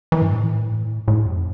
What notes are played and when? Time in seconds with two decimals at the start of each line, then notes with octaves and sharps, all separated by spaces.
0.12 E3
0.22 G2
0.31 A2
1.08 A2
1.26 F2